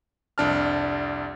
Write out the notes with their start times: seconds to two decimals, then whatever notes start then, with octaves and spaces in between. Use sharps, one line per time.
0.38 C2 F2 D4 A5 F6